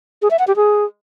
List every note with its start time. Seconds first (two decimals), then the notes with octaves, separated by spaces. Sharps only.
0.22 G#4
0.31 E5
0.39 F#5
0.48 G4
0.56 G#4